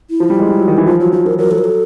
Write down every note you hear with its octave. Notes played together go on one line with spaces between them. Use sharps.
E4
F3
G3
G#3
G3
F#3
D#3
E3
F3 F4
F#3 F4
F3 F4
F3 A#4
F#3 A#4
F#3 A4
A#4
A4